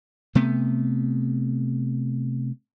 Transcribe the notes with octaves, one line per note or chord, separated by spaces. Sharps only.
C3 A3 B3